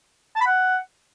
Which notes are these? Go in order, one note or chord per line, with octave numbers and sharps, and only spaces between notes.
A5
B5
F#5